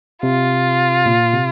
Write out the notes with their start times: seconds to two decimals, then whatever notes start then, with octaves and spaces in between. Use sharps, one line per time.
0.23 C3 F4
1.06 A#2
1.33 C3